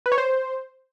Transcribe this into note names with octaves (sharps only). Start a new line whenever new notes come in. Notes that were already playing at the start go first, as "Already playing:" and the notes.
B4
C#5
C5